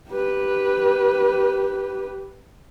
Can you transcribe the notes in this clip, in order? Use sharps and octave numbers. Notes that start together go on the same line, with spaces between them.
G4 B4